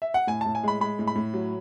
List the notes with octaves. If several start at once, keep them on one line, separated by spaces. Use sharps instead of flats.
E5
F#5
A2 G#5
A5
A2
G#5
G#3 B5
G#3 B5
A2
B5
A2
F#3